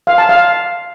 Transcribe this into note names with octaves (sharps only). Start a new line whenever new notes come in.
F5
A5
F5